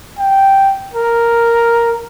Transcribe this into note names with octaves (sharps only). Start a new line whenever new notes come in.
G5
A#4